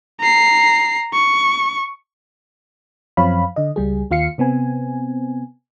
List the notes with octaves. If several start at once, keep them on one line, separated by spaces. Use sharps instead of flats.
A#5 C7
C#6
F#2 F3 C4 C#5 F5 B5
D3 D#5
C#2 G3 G#4
D#2 F4 F5 C7 C#7
C3 B3 C4 G#5